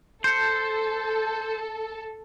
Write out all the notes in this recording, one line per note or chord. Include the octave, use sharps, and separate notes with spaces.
A4 C5 G6 C#7